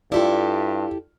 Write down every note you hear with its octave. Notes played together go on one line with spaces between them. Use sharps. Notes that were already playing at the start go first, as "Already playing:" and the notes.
G2 E4 F4 G4 A4 D5